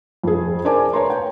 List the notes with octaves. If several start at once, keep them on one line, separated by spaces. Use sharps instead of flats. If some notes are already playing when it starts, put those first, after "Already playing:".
F2 G#4
A#4 C5 D5 G#5 A5 D6
B4 C#5 A#5 C6
G5